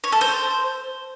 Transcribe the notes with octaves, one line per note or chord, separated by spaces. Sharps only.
C#5
A4
C5